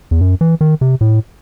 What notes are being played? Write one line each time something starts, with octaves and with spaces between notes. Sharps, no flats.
E2
F#2
E3
D#3
C3
A2